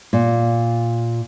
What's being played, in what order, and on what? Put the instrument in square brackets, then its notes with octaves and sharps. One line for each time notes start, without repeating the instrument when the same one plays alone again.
[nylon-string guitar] A#2